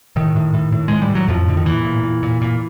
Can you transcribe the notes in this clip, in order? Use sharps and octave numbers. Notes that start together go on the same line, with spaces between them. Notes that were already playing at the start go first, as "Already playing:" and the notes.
A2 D#3
A2
A2
A2
A2 G#3
G3
A2
F#3
F2 A2 F3
A2 D3
D#3
E2 A#2 E3
A#2
A#2
A#2
A#2